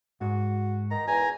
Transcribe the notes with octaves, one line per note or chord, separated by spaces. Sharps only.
G#2 F#4
D#3 A#5
E2 G#5 A#5